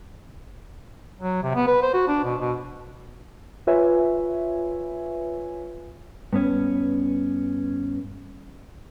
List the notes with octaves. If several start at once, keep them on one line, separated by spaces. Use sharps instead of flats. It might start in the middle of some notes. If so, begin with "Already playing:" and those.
F#3
C3
B3
B4
C5
F#4
D4
B2
B2
F4 B4 C#5 E5 G#5
G2 B3 C#4